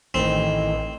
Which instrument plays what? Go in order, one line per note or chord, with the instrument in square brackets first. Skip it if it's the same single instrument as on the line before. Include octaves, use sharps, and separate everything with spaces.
[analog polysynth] A1 [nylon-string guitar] D#3 E3 A3 [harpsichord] C4